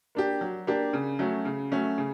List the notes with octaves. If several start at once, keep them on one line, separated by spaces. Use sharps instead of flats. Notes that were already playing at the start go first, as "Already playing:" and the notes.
A#3 D4 G4
F#3
A#3 D4 G4
C#3
F#3 A3 C#4
C#3
F#3 A3 C#4
C#3